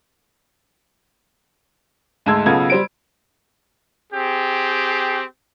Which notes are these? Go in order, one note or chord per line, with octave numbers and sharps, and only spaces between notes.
D2 G#2 G#3 A5 E6 G#6
B1 C#3 B3 F4 A4 G#6
G3 C5 D7
C4 G4 G#4